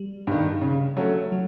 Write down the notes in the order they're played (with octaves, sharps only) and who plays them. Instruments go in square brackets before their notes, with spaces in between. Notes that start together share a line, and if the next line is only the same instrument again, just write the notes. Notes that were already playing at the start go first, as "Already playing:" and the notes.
Already playing: [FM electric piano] G3
[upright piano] G2 D#3
C#3
F#3 A3 C#4
[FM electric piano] F#3